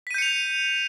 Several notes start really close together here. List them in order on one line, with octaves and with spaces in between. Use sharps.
B6 D#7 G6 C#7 F7